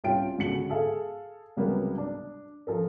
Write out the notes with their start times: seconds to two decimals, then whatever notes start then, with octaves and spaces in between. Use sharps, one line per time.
0.04 C2 C#4 F4 G5 D7
0.38 C#2 D3 F#4 C#7 F#7
0.69 G#4 A4 F5
1.57 C#2 C3 F#3 G3 A#3 B3
1.98 D4
2.67 F3 A4 A#4